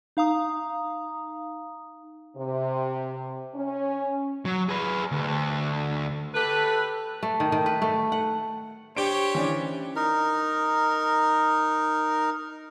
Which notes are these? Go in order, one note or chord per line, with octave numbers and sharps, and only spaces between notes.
D#4 F5 A#5 D#6
C3
C#4
F#3
G#4 B4
D2
A3 G4 A4 B4
A3
D#3
D#3
B4
A3
F#5
D4 G4 C5 C#5 D7
E3 C#4 D4
D#4 A#4